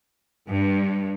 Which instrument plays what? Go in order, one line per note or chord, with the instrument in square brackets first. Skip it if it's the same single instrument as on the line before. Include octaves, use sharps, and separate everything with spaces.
[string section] G2